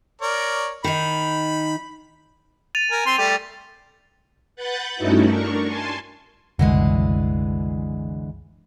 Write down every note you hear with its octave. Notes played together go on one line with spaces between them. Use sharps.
A#4 C#5 D5
D#3 D#4 B5
A6 D#7 F7
A#4 G#5
C4 C6
G3 A3 G4
B4 F#5 F#6 G6 A6
G2 A3 C#4 D#4 E4 F#4
D4 A#4 C#6
G#5 A5 C6
F#1 C2 D3 E3 G#3